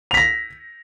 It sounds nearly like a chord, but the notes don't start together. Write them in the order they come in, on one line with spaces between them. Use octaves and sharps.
F7 B6 A#6